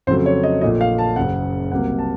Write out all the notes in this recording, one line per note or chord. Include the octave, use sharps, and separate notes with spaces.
F2 C#3 F#3 A3 C5
C#5
D#5
A#1 A#2 A3 D#5
F5
A5
F#1 F#2 C#3 F#5
C2 C3 F#3 A#3 F#5
A5